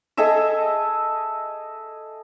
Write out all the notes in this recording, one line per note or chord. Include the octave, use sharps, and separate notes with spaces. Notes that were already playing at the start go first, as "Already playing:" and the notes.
G#4 A4 D#5 E5